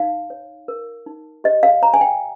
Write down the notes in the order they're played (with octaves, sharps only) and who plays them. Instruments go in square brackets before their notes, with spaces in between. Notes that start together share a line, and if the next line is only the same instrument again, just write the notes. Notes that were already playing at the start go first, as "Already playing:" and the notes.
Already playing: [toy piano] D#4 F5
C#5
A#4
D#4
G4 D#5
F5
C#5 A#5
G#5
G5